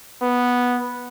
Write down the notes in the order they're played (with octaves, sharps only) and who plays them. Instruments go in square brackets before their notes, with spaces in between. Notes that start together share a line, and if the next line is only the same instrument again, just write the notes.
[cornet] B3